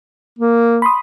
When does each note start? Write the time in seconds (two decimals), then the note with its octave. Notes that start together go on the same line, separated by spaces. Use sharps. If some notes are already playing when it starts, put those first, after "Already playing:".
0.39 A#3
0.82 B5 C6 D#6